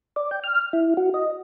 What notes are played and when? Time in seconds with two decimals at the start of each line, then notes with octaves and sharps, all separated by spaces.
0.16 D5
0.31 G5
0.44 F6
0.73 E4
0.97 F#4
1.14 D#5